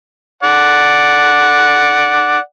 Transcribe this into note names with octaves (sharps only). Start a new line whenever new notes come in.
D5 F#5